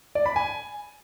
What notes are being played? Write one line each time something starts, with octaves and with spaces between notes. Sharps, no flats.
D5
B5
G#5